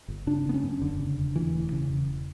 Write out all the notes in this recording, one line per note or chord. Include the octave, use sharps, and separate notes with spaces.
G1
C#3 D4
G1 B3
C#4
F#2
E1 D3
C#3
E1
D2 E3
E1
C#3
E1